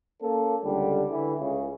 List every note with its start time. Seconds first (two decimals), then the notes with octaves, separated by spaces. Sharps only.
0.22 A#3 C#4 A4
0.62 C#2 D3 G3
1.10 D3 E3
1.39 C#2 C#3